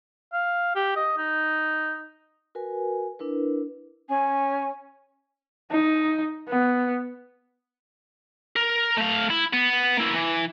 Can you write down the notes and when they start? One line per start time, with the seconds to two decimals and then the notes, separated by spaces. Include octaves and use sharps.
0.33 F5
0.76 G4
0.96 D#5
1.18 D#4
2.55 F#4 A#4 B4 G#5
3.19 D4 E4 A#4 B4
4.08 C#4 G#5
5.71 D#4
6.49 B3
8.56 A#4
8.97 A3 F5
9.30 E4
9.53 B3
9.97 A#3 E4
10.14 E3